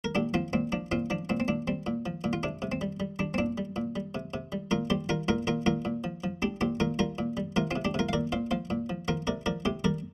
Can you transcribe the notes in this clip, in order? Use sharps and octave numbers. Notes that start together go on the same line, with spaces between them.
A#4
A#2 D4 G4
F3 C4 F4
A#2 C4
F3 D4
A#2 C4 F4
F3 D4
A#2 C4
C4
A#2 D4
G3 C4
A#2
F3
A#2
F4
C3 D4
C3
C4
G3
G3
G3 D4
C4
A#2 D4
G3
A#2
G3
C3
C3
G3
A#2 F4 A#4
G3 G4 C5
G3 F4 A#4
A#2 F4 A#4
A#2 F4 A#4
A#2 F4 A#4
A#2
F3
F3
G3 D4 G4
A#2 G4 C5
A#2 F4 A#4
G3 F4 A#4
A#2
G3
C3 F4 A#4
C3 C4 F4
D4 G4
C3 F4 A#4
F5
A#2 A#4 D5
A#2 C5 F5
F3 C5 F5
A#2
F3
F3 F4 A#4
C3 A#4 D5
F3 A#4 D5
C3 G4 C5
G3 A#4 D5